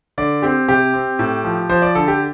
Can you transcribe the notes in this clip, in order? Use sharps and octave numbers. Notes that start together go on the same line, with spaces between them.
D3 D5
C4 G4
C3 G4
C4
A2
F3
F3 C5
D5
D3 A4
G4